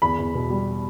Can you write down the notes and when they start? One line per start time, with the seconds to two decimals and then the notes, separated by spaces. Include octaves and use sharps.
0.02 E2 B5
0.18 E2
0.35 B2
0.50 G3